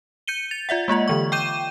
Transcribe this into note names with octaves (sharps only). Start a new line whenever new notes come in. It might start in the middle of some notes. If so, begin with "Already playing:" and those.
G6 C#7 D#7 G7
A6 F7
F4 D5 E5 F#5
G#3 A#3 F4 D#5
D3 E3 C#6
G5 D6 G6 D#7 E7